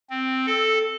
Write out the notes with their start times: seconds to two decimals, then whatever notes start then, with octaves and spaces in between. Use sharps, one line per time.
0.10 C4
0.46 A4